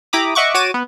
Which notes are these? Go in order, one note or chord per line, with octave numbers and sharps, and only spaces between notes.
E4 G4 A#5 B5 D6 D#6
D#5 E5 F#5 C#6 D6
F#4 C#5 D6 A6 D#7 E7
B3